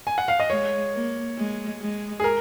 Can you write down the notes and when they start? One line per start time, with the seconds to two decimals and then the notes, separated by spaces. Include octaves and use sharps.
0.07 G#5
0.18 F#5
0.28 F5
0.40 D#5
0.50 G#3 C#5
0.94 A#3
1.37 G#3
1.80 G#3
2.20 G#4
2.24 A#4